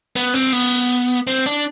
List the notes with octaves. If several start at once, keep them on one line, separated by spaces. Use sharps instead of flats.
B3
C4
B3
C4
D4